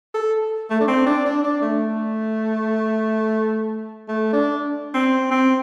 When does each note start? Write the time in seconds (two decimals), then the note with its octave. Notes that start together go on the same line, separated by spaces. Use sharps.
0.14 A4
0.70 A3
0.81 D4
0.88 C4
1.06 D4
1.25 D4
1.44 D4
1.62 A3
4.08 A3
4.33 D4
4.94 C4
5.31 C4